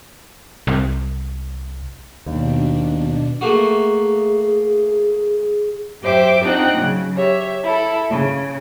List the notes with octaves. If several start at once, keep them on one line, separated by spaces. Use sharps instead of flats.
C2
D#2 B2 D4
A3 A#3 F#4 G#4
F#2 G4 C5 E5 D6
C4 D4 D#4 F4 F#5 G5
C#3 F#3
G4 C#5 E5
E4 A4
C#3